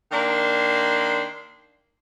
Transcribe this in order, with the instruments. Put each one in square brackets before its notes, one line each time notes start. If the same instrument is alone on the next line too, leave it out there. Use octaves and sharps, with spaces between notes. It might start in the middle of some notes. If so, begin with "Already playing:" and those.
[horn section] D#3 A#3 D4 C6